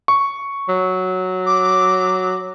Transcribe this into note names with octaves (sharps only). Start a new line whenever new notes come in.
C#6
F#3
D6